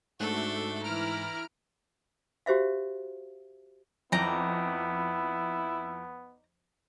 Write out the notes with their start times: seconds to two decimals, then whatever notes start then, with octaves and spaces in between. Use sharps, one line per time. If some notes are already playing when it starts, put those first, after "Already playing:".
0.20 G#2 A3 D4 F#4 A4 F#6
0.84 E3 E4 A#5 F6 D7
2.46 F#4 G4 C5 E5 F5
4.12 F2 B3 D#4 E4 D5 A#5